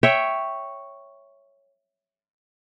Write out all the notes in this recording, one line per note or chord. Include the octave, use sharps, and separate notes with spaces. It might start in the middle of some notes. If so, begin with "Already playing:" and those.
C#5 E5 G5